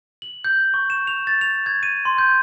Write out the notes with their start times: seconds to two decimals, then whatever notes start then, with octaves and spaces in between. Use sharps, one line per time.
0.22 F#7
0.44 G6
0.74 C#6
0.90 E7
1.07 F7
1.27 A6
1.41 F7
1.66 G#6
1.83 D#7
2.05 C6
2.18 G6